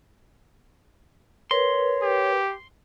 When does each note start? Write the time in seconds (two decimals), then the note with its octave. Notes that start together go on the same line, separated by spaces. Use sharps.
1.51 A#4 B4 C#5 C6
2.03 G4